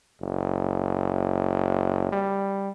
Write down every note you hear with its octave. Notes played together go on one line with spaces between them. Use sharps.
F#1
G3